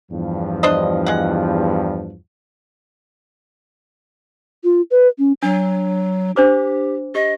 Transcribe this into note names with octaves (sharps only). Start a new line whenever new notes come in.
E2 G2 F3
D4 C5 D#5
G#3 F#5
F4
B4
C#4
F#3 D4
D4 G4 C5 D6
G4 D#5